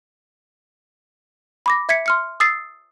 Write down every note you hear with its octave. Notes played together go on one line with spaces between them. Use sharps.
B5 D6 A#6
E5 G#6 B6 C#7
C6 F6 C#7
D#6 E6 A6 C7